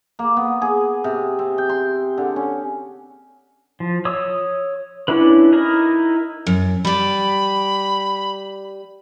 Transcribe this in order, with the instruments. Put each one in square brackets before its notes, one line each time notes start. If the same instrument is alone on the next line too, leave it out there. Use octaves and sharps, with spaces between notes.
[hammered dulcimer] A#3
B3
G#4
C3
C4
G5
C6
D3
C#4
[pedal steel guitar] F3
C#5 D#6 E6
C#4 D4 E4 B4
D#4 E4 A#4 D#5
[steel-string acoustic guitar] F#2
[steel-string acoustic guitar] G3 D5 [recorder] B5